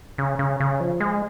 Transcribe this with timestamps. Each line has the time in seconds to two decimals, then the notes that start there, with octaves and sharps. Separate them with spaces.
0.18 C#3
0.39 C#3
0.60 C#3
0.80 F3
1.00 G#3